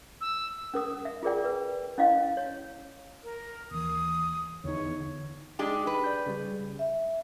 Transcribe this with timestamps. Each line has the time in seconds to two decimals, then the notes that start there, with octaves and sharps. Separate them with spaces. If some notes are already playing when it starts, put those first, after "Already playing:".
0.21 E6
0.74 C#4 A#4 D#6
1.05 E5
1.23 F4 G#4 A#4 D5 G5
1.45 B4
1.98 C#4 E4 D#5 F5
2.37 C#5
3.24 A#4
3.71 D#2 E3 D#6
4.64 E2 D3 D#4 C#5
5.59 G#3 D4 D#4 G4 G#4
5.87 B4
6.04 D5 G6
6.26 C#3 G3
6.79 E5